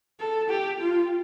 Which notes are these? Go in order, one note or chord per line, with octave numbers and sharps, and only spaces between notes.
A4
G4
F4